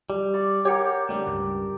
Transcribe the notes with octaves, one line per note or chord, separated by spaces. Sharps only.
G3
D5 C#6
G4 A#4 C#5 F#5
D3 G3 A3
C#2 G2